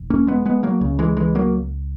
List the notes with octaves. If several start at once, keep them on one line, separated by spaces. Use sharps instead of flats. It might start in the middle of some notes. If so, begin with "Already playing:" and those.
Already playing: E1 D#2
A#3 C#4
G#3 B3
G#3 B3
F#3 A#3
C#2 C#3
E3 G#3
E3 G#3
F#3 A#3